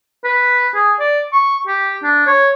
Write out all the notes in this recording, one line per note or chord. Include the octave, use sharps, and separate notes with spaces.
B4
G#4
D5
C#6
G4
D4
C#5